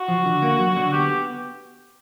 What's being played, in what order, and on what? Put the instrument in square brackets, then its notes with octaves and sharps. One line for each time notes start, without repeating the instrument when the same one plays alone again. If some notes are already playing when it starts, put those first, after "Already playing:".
Already playing: [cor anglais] F#4
[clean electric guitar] F3
D3
A#3
F#3
D3
[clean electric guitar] B3 [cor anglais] G4